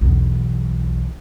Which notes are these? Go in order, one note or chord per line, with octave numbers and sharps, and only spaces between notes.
B1 E2